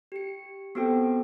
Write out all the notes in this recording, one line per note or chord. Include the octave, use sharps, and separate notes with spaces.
G4 C#7
B3 C4 F#4 A4 C5 G5